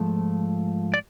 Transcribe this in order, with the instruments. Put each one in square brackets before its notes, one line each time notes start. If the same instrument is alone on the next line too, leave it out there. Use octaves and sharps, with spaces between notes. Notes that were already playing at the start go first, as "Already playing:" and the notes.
Already playing: [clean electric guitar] G#2 F3 A3
D5